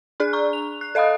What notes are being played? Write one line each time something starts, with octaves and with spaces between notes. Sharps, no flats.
D4 G#4 D5 F#6
A#5 C#6
F7
F#6
A4 D#5 F5 B5 D#6